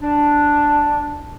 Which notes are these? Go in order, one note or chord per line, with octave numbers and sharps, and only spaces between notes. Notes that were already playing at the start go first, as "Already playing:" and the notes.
D4